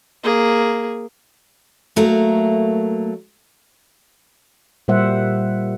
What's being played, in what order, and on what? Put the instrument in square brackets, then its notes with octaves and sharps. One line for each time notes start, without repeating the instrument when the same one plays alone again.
[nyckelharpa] A#3 G#4
[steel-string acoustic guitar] F#3 A3 A#3 A#4
[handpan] A#2 G3 A#3 C5 E5 F#5